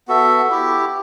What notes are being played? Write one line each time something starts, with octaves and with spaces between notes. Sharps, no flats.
B3 F#4 A4 E5
E4 G4